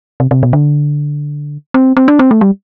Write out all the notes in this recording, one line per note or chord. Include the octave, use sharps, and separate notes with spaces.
C3
C3
B2
D3
C4
C4
D4
C4
A3
G3